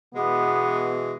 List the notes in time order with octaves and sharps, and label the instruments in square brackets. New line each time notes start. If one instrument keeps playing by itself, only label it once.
[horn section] B2 E3 G#3 [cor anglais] B3